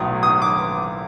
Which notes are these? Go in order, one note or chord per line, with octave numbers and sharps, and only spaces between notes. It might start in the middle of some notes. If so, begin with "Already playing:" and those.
Already playing: B1 A2 F#3 D#6
D#6
D6